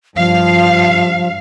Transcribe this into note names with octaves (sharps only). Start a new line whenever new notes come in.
G2 F3 F5